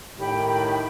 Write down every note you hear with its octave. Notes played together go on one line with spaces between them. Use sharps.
A2 D#3 G4 B5